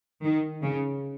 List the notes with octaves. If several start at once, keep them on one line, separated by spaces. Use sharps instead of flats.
D#3
C#3